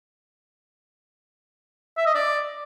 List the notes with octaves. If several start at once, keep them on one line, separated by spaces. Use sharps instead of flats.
E5
D#5
D5